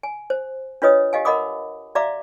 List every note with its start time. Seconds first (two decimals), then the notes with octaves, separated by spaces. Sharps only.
0.03 G#5
0.30 C5
0.82 D4 F4 B4 C#5 D#5 D#6
1.13 G4 D#5 F5 G#5
1.25 A#4 D#5 F#5 B5 D6 D#6
1.95 F#4 D5 E5 F5 A#5 D6